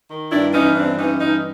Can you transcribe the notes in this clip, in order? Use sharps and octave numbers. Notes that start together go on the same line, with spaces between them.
D#3
G2 D4 E4
E3 C#4 D#4
G2 C4 D4
E3 C#4 D#4
G2 C#4 D#4